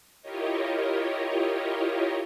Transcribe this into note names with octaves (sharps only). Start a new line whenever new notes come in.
E4 F4 G4 A#4 C#5 D#5